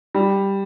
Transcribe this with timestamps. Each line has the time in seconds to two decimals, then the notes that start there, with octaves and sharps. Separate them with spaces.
0.15 G3